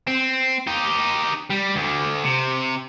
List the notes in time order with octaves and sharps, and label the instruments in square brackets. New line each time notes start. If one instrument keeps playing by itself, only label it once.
[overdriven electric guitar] C4
D#4 G4
G3
D2 D3
C3